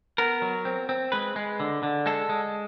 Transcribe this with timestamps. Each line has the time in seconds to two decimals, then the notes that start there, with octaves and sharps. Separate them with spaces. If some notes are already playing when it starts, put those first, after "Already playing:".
0.18 B3 A#4
0.42 F#3
0.65 C4
0.89 C4
1.12 G#3 B4
1.36 G#3
1.60 D3
1.83 D3
2.06 G#3 A4
2.29 G#3